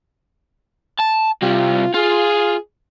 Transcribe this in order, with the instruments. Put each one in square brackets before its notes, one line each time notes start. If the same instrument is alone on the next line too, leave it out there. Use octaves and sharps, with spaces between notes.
[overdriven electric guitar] A5
[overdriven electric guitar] C3 G3 [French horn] F4
[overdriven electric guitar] F4 [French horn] G#4